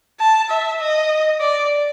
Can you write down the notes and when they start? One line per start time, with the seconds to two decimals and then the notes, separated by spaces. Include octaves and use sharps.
0.20 A5
0.50 E5
0.80 D#5
1.40 D5